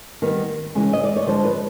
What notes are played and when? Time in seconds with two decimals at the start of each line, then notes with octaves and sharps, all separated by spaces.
0.22 D#3 G3 B3
0.75 C#3 E3 G#3
0.93 D#5
1.04 D5
1.16 C#5
1.27 D3 F3 G#3 C5
1.45 B4